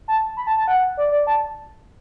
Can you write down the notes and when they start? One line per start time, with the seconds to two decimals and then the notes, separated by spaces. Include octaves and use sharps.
0.08 A5
0.37 B5
0.47 A5
0.58 A5
0.68 F#5
0.97 D5
1.11 D5
1.27 A5